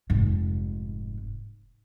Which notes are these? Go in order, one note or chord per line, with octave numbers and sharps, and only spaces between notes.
F1 G#2